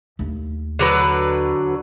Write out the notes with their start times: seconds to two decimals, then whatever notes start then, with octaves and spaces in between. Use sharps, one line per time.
0.19 D#2 A3
0.79 D3 F#3 B4